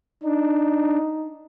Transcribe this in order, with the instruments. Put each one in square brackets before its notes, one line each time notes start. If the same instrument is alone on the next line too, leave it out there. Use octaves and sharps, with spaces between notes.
[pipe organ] D4 [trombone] D#4